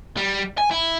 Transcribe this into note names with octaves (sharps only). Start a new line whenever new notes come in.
G3
G#5
E4